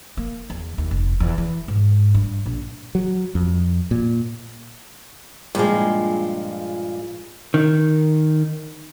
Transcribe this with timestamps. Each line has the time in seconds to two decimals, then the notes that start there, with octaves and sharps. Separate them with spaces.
0.17 A#3
0.50 E2
0.78 D#2
0.91 F1
1.20 E2
1.38 E3
1.68 G#2
2.15 G2
2.46 A#1
2.95 F#3
3.35 F2
3.91 A#2
5.55 G2 A#2 F3 G#3
7.54 D#3